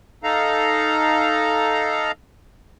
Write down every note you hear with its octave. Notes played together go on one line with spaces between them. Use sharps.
D#4 A4 F5 A#5